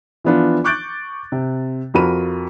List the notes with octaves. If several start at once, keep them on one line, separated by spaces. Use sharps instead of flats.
E3 F3 B3 D4 F4
C#6 D6 F#6 G6 A6 D7
C3
F2 F4 F#4 A#4 B5 D#7